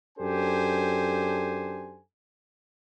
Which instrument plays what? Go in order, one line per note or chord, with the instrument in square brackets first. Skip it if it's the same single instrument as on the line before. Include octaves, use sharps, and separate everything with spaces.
[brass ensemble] F#2 D4 G4 A4 C5 G#5